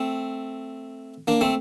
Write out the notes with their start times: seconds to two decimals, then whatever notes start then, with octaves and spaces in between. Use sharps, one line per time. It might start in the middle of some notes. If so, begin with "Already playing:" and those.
Already playing: A3 C4
1.27 A#3 D4
1.41 A3 C4